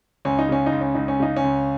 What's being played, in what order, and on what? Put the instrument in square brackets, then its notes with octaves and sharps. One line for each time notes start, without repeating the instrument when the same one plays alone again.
[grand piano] C#2 [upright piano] C#4
[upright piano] D#4
[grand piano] C#3 [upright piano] C#4
[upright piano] D#4
[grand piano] C#2
[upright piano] C#4
[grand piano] C#2 [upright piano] D#4
[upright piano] C#4
[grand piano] C#3 [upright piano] D#4
[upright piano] C#4
[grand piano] C#2